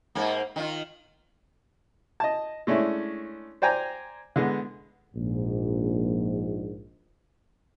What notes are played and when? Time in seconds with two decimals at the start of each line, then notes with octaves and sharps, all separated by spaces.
0.15 G#2 A#3
0.56 D#3 F4
2.20 D#5 A5
2.67 G#3 A3 C#4 D4 E4
3.62 C5 D5 G5 G#5 A#5
4.36 D3 G#3 B3
5.14 A#1 G#2